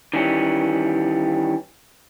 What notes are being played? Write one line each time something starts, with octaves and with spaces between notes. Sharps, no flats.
D#3 E3 G3 C#4